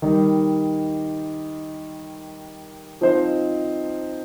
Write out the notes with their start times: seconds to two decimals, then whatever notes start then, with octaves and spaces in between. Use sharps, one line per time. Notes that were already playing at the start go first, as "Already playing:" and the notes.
0.02 D#3 G3 D#4
3.01 F3 C4 D#4 C5 D#5